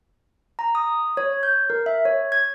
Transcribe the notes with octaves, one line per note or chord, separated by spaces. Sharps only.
A#5
D#6
C#5
G6
A#4
E5
C#5
G#6